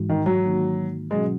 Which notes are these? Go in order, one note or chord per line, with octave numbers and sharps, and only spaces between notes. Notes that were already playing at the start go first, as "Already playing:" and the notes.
Already playing: G#2 E3 G#3 D#4 F#4
D#3
F#3
D#3 A#3 D#4 F#4
B2 F#3 G#3 C#4 F#4